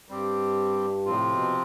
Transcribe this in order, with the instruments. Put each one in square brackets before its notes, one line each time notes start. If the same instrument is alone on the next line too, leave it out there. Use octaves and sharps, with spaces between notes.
[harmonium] G2 [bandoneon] G3 C4 G4
[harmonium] A2 [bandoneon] C3 F3 C4 F4
[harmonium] B2